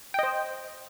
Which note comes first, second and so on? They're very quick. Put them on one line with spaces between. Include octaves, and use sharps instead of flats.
G5 D#5 C5